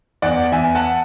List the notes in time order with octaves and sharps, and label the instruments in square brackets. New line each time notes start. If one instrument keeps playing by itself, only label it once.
[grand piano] E2 D5 F#5
E2 E5 G#5
F#5 A5